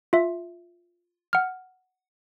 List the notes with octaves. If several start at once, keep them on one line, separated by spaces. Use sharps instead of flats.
F4 E5
F#5 F6